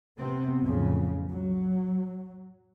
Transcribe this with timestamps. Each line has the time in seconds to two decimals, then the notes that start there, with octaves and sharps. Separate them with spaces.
0.18 C3 B3 C4
0.61 B1 F2 A2 C#3
1.31 F#3